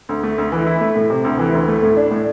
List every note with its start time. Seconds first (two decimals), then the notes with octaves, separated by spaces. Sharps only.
0.09 D2
0.23 A3
0.38 D2
0.52 E3
0.67 E4
0.81 A3
0.96 A2
1.10 C3
1.24 D2
1.39 E3
1.53 D2
1.68 A3
1.82 A2
1.97 D4
2.11 A2